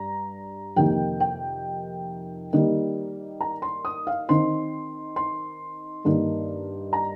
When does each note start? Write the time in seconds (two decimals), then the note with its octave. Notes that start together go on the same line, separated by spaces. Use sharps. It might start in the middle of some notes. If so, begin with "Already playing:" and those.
Already playing: G2 A#5
0.76 F2 C3 D#3 A#3 D#4 G5
1.20 G5
2.53 D#3 G3 A#3 D#4
3.41 A#5
3.62 C6
3.85 D#6
4.07 F5
4.29 D#3 C4 D#4 C6
5.16 C6
6.05 G2 D#3 A#3 D#4
6.93 A#5